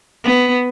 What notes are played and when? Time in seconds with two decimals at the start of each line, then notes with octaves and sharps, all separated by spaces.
0.24 B3